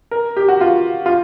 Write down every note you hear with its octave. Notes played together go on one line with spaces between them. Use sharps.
A#4
G4
F#4
F4
F4